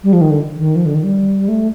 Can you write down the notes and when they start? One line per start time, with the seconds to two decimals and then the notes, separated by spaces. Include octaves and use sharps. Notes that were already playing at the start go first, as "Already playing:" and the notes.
0.03 G3
0.13 F3
0.21 D#3
0.30 D3
0.58 D#3
0.76 F3
0.86 D3
0.95 D#3
1.03 G3
1.48 A3